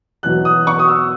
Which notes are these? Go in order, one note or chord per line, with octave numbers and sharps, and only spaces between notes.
E2 B2 F#3 F#6
D#6
C#6
D#6
E6